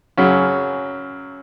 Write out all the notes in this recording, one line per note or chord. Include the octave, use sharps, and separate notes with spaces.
F#2 C#3 F#3